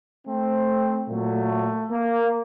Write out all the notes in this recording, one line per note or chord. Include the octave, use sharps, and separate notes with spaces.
A3 C4
A#2 F#3 A3
A#3